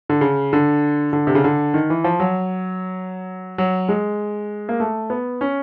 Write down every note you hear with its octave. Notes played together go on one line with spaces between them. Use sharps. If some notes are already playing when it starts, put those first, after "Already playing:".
D3
C#3
D3
D3
C3
C#3
D3
D#3
E3
F3
F#3
F#3
G#3
A#3
A3
B3
C#4